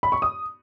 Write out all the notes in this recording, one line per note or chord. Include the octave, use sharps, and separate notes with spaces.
B5
C#6
D#6